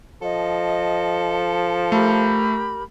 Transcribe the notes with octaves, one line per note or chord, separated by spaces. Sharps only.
F3 A4 D#5
A3 G4 A#4 B5